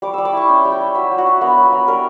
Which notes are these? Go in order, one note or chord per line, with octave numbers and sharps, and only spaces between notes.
G3 D6
G3 E6
D6
E4 C#6
C#4 G5
G3
G5
G3
F#3 E5
F#3
F#4
D4
B3 A#4
F#3
B4
F#3
G3 A#4